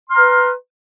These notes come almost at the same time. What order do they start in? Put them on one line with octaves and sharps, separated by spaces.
C6 F6 A#5 B4